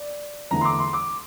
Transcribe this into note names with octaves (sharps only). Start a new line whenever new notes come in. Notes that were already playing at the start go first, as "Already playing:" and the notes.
Already playing: D5
E2 D3 A3 A#5
C6
D6
C6
D6